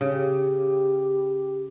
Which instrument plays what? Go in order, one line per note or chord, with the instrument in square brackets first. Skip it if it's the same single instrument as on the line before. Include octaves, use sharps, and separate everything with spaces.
[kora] C#3 [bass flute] G4